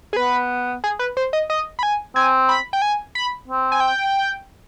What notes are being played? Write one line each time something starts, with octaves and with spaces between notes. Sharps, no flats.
G#4
B3 B4
G#4
B4
C5
D#5
D#5
B5
G#5
C4 G#5
B5
G5
G#5
B5
C4
G#5
G5